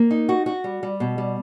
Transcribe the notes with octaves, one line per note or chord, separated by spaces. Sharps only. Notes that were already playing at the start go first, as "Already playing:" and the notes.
Already playing: A#3
D#4
F#4
F#4
G3
G3
B2
G3